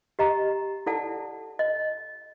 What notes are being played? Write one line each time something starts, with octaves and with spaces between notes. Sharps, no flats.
G4 D#5 A#5
E4 A4 D5 F#5 A5
D#5